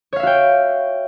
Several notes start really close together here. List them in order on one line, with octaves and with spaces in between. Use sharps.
C#5 F5 E5 F#4 G5